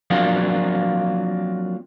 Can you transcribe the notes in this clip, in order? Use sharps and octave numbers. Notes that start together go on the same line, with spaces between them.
F3 F#3 A#3 C4 D4 F4